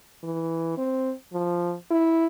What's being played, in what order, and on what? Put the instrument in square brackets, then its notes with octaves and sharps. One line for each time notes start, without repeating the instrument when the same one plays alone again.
[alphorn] E3
C4
F3
E4